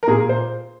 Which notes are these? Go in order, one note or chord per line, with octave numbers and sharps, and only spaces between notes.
A#4
A#2 G#4
C5